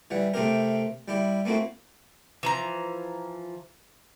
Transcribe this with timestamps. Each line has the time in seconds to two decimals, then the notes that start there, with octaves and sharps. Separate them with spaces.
0.11 E3 G3 F#5
0.34 C3 A3 C4 G4 A#4
1.08 G3 E4 G4
1.45 A3 A#3 C4 E4 F#4
2.43 E3 F3 A#5